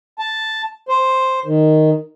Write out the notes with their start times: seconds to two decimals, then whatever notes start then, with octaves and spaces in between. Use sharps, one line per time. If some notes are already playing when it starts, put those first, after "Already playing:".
0.19 A5
0.89 C5
1.45 D#3